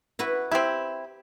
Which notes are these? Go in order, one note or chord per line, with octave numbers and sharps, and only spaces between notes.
E4 F#4 B4
C4 E4 G4